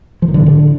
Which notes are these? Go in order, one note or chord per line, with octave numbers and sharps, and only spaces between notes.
F3
D#3
D3
A2
D3